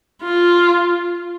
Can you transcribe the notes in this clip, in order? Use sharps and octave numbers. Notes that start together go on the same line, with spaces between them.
F4